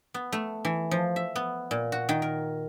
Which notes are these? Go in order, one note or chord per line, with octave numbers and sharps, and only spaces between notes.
B3
A3
E3
F3
E5
B3
A#2
F#4
D#3
A#4